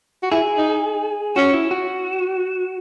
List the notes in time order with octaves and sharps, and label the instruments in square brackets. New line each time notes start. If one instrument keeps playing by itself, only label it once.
[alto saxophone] F#4
[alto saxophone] E4 [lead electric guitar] G#4
[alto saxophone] D#4
[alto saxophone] C#4 [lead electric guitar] F#4
[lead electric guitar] E4
F#4